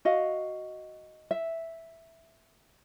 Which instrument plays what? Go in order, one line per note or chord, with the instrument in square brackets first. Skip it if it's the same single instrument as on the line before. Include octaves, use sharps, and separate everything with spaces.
[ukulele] F#4 D#5 F5
E5